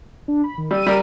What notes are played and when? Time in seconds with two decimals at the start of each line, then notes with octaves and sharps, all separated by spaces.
0.28 D4
0.44 B5
0.58 D#3
0.71 G3 E6 D#7
0.87 G3 A#4